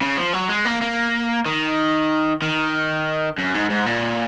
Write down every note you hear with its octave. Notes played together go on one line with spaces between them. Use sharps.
C#3
F3
F#3
G#3
A#3
A#3
D#3
D#3
F#2
G#2
G#2
A#2